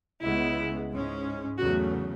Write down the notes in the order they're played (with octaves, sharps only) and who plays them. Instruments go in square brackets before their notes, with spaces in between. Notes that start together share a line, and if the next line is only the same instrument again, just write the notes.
[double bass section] C#2 C#3 G#3 B3 [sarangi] E4
[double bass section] G#2 G#3 C#4
[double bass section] E2 C#3 F#3 A3 [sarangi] F#4